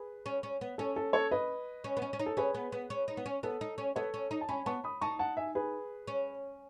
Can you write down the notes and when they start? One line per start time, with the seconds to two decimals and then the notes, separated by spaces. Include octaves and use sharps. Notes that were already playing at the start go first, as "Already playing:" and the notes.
Already playing: G#4 B4
0.26 C#4
0.43 C#4
0.61 B3
0.78 C#4 A4
0.96 A4
1.13 A4 C#5
1.31 B4 D#5
1.84 C#4
1.97 B3
2.02 C#4
2.13 C#4
2.19 D#4
2.26 A4
2.37 C#4 G#4 B4
2.54 B3
2.72 B3
2.90 C#4
3.08 D#4
3.17 B3
3.26 C#4
3.43 B3 A4
3.61 D#4
3.78 C#4
3.96 B3 A4 C#5
4.14 C#4
4.31 D#4
4.41 A5
4.49 C#4 G#5 B5
4.66 B3 A5 C#6
4.84 B5 D#6
5.01 D#4 A5 C#6
5.19 F#5 A5
5.37 E5 G#5
5.55 G#4 B4
6.07 C#4